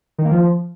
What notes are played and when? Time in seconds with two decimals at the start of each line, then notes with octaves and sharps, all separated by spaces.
0.18 D#3
0.25 A#3
0.31 F3